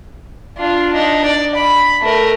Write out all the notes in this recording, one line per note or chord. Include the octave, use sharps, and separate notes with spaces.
D4 F4
D4 D#4
D5
B5
A3 A#4